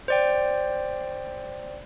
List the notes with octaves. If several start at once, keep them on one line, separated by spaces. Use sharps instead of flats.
C5 D5 G5